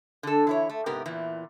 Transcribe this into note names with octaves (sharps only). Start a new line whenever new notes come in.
D3 A4
E3 E4 C#5
A3
G#2 C3 B3 G4 A#4
E2 A#2 E3